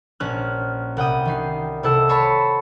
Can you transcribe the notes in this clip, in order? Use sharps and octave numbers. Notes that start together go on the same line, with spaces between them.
A#1 C#4 F6 F#6
C2 F#5 G5 D#6
D#3 D#4 C7
C3 E4 A4 F#5 E6
C5 C#5 A5 B5 C#6